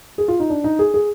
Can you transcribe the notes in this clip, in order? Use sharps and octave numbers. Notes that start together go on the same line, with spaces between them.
G#4
F4
D#4
D4
D#4
G#4
G#4